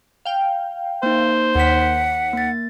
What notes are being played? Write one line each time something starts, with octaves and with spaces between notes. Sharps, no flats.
F5 G5
A#3 D#4 C5
D#2 F#5 B6
A#3 A6